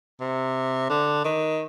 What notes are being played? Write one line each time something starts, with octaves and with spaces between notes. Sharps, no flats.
C3
D3
D#3